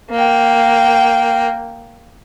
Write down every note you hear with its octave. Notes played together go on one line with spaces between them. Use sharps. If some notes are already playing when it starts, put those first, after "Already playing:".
A#3 G5